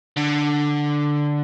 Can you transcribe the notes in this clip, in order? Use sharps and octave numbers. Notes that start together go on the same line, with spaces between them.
D3